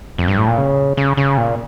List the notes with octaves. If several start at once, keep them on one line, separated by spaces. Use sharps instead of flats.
F2
G2
A2
A#2
C#3
C#3
C#3
A#2